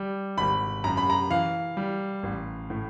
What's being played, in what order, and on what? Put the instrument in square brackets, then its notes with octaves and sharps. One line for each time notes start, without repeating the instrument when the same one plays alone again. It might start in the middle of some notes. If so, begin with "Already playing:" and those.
Already playing: [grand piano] G3
[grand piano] G#1 [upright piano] B5
[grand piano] F#2 [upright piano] A#5
[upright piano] B5
A#5
[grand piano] E3 [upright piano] F5
[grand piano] G3
A1
A2